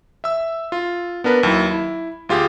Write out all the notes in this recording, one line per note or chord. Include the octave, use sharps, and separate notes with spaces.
E5 E6
F4
B3 D4 A#4 B4
D#2 F#3 E4
E4
D2 F4 G4 G#4